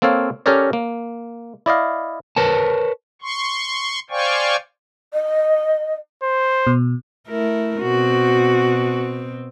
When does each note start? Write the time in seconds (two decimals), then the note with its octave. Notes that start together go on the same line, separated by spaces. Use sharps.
0.02 A#3 C4 A4 C#5 F5
0.46 C#4 G4 A4 A#4 C#5 D5
0.73 A#3
1.66 E4 D5 D#5 F5
2.36 A#4 B4 C#5 A5
3.22 C6 C#6
4.10 C5 D5 F5 G5 G#5 C#6
5.14 D#5
6.23 C5
6.67 B2
7.27 A3 E4 A#4
7.82 B2 C4 F#4